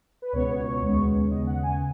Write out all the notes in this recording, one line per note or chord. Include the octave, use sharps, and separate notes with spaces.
B4
C#2 B2 B3 C#5
D#2 C#3 G#3 B3
D#2 C#3 B3 D#5
F#5
G#5